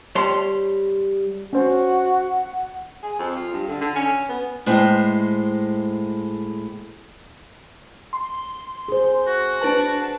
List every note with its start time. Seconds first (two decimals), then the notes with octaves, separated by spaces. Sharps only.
0.15 G3 C#5 A5 C6
1.53 C#4 F#4 C5 F#5
3.03 G#4
3.19 F2
3.37 F4
3.53 G2
3.68 D3
3.81 D3
3.96 C#4
4.29 B3
4.66 A2 G#3 C5
8.13 C6
8.88 G#4 C5
9.27 F#4
9.61 D4 B4 A5